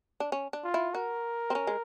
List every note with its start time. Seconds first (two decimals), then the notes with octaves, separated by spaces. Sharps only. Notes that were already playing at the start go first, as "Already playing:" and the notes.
0.20 D4
0.32 C#4
0.53 D4
0.64 F4
0.74 E4
0.94 F#4 A#4
1.50 C4
1.55 C#4
1.67 G#3